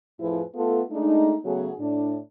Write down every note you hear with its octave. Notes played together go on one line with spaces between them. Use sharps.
F2 A2 F3 E4 G#4 B4
A3 B3 F4 A4
G#3 A3 D4 D#4
C#3 F#3 A3 B3 F#4 G#4
A2 D4